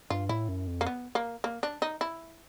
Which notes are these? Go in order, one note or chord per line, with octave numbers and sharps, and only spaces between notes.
G2 F4
A2 E4
F#2
F2
A#3
B3
A#3
A#3
D4
D#4
E4